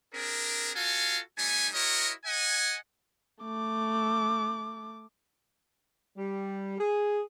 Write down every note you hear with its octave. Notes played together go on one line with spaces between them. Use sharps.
C4 D4 G#4 A#4
F4 F#4 A4 F5 G#5
G3 A3 D#4 G#5
E4 F#4 A#4 C#5 D#5
D#5 F#5 G#5
A3 D6
G3
G#4